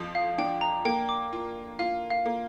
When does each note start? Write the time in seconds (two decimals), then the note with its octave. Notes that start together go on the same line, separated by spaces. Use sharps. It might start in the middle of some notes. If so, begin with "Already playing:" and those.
Already playing: F2 F3
0.15 F5
0.38 D4 G5
0.61 A#5
0.85 A#3 G5
1.09 D6
1.33 F4
1.79 F4 F5
2.10 F5
2.26 A#3